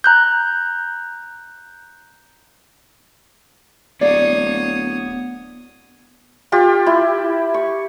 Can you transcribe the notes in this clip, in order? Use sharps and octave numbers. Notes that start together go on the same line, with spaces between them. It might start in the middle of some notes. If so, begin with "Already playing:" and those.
A#5 F#6 G6
D1 B3 C#5 D5 F5 D#6
F4 G4
E4
C#6